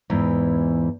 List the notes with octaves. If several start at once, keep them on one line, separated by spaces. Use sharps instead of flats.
E2 G#2 E3